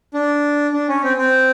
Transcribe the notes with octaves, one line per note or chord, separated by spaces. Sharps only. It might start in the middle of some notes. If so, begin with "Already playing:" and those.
D4
D4
C#4
C4
C4